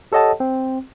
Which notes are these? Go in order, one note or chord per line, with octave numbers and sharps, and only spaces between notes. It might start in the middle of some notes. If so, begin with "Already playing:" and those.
G4 A4 C#5 D#5 F#5 A5
C4